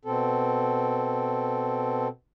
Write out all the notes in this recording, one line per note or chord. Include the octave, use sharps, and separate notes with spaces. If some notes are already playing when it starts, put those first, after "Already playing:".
B2 C4 A4